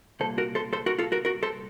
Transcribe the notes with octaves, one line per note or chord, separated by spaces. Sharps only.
C2 A#2 A4 C5
F#4 A#4
A4 C5
A4 C5
F#4 A#4
F4 A4
F#4 A#4
F#4 A#4
A4 C5